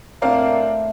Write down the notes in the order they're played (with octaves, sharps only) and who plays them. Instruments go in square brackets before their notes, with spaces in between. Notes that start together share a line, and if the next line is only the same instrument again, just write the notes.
[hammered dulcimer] A2 [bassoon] A#3 [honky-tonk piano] C4 D4 F5